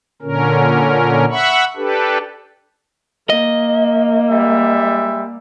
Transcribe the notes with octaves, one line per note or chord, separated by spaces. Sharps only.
A#2 D3 C#4 A#4
E5 F#5 B5 C#6
D4 G4 A4 B4
A#3 D#5
G3 G#3 E5